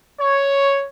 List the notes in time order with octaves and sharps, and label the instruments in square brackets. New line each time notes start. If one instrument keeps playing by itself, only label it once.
[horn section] C#5